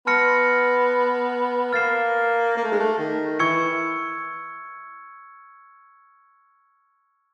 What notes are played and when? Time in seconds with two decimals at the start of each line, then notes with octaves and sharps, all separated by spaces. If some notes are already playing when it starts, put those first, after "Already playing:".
0.07 B3 A5 C6 F6 A#6 C#7
1.73 A#3 F6 A6 C7 E7
2.57 A#3
2.64 A3
2.72 G#3
2.80 A3
2.98 D#3
3.39 E3 C#6 E6 G#6 C#7